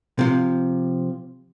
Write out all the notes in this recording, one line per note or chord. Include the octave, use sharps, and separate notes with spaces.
C3 F3